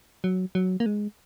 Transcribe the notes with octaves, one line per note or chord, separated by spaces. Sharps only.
F#3
F#3
A#3
G#3